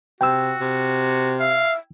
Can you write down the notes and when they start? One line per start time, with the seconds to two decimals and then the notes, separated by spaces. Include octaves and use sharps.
0.21 C3 F#4 G5 E6
0.61 C3
1.39 E5 F5